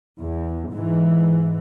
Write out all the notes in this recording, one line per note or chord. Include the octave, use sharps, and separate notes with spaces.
E2
G#2 E3